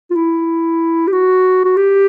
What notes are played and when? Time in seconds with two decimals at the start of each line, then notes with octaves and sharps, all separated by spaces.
0.10 F4
0.15 E4
1.07 G4
1.12 F#4
1.64 F#4
1.76 G4